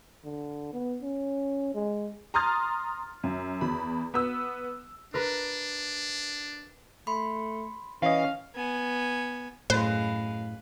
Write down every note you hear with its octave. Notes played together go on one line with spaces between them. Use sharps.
D3
B3
C#4
G#3
A#5 C6 D#6 F6 A6
F#2
E2 B5
B3 E6
D4 A#4 B4
A3 B5 C6
E3 C#4 D#5 F5
B3 G#5
F#2 A2 G#3 B4 C5 F5